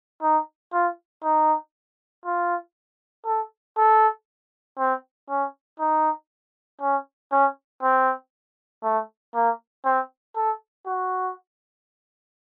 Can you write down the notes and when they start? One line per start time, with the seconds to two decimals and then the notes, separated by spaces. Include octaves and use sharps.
0.22 D#4
0.73 F4
1.24 D#4
2.25 F4
3.26 A4
3.77 A4
4.79 C4
5.29 C#4
5.80 D#4
6.81 C#4
7.32 C#4
7.83 C4
8.83 A3
9.34 A#3
9.85 C4
10.36 A4
10.86 F#4